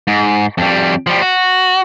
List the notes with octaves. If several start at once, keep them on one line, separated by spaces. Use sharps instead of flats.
G#2
F2 G3
F3 G3
F#4